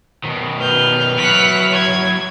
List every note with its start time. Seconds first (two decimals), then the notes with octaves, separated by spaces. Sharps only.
0.24 B2 D#3
0.61 B4 F6 G6
1.18 F#3 E4 F#5 B6
1.72 G#6